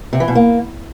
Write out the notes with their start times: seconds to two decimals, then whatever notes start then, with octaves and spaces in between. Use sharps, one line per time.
0.13 C3
0.20 E3
0.28 B2
0.35 A#3